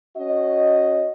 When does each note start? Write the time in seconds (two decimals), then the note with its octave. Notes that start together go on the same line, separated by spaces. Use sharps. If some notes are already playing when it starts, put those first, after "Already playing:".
0.16 C#4 F#4 D#5